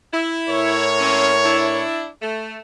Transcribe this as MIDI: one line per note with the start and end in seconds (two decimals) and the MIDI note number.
0.13 0.90 64
0.49 1.82 45
0.49 1.82 70
0.49 1.82 73
1.00 1.32 58
1.00 1.32 60
1.00 1.32 61
1.44 2.08 62
1.44 2.08 64
2.22 2.60 57